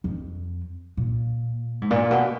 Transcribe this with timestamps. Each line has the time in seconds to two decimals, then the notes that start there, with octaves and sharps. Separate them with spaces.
0.04 F2
0.97 A#2
1.82 G#2
1.90 A#2
2.11 B2